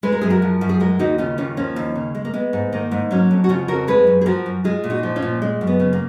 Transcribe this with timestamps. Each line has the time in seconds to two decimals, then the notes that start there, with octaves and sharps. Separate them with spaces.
0.03 G#3 B4
0.12 A#4
0.21 F#2 G#4
0.30 F#4 A#4
0.42 F3
0.61 F#2
0.69 G#4
0.80 G#3 F#4 A#4
0.99 D#2 D#4 F#4
1.18 C#3 C#4 F4
1.38 D#2 C#4 F4
1.57 F3 A#3 C#4
1.76 D#2
1.96 C#3
2.15 G#3
2.25 A#3
2.34 G#3 B3
2.53 G#2
2.72 D#3 A#3
2.91 G#2
3.11 F#3 A#3 C#4
3.31 F2
3.44 F#4
3.49 C#3 C#4 F4
3.68 F2 F#4 A#4
3.87 G#3 G#4 B4
4.07 F#2
4.21 G#4
4.26 F3 F#4 A#4
4.46 F#2
4.64 G#3 F4 G#4
4.84 A#2
4.90 D#4 F#4
5.03 F3
5.16 C#4 F4
5.22 A#2
5.42 G#3
5.61 F#2
5.67 B3
5.79 C#3
5.93 A#3